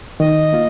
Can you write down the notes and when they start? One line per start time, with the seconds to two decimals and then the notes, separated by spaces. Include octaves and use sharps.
0.19 D#3 D#5
0.53 A#3 F4